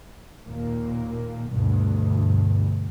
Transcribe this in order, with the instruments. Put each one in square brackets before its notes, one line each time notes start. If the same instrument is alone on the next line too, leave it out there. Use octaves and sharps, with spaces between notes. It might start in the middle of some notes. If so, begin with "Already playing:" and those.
[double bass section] D#2 A#2 A#3
D2 G2 B2